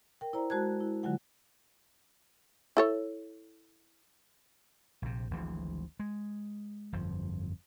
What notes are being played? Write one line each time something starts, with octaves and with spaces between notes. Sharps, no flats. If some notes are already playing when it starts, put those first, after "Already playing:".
A#4 G5
E4 C5 D5 A#5
G#3 F#4 C5 A5 F#6 G#6
E4
D3 F#3 G#3 F4 F#5
E4 A4 C#5
A#1 C3
G#1 D2 E3 F3
G#3
G1 F2 F3